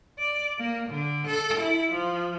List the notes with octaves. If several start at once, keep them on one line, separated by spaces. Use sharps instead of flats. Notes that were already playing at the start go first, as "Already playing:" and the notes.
D5
A#3
D3
A4
E4
F3